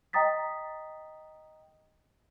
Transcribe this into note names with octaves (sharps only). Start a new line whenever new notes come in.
D#5 G5 A#5 D#6 A6 B6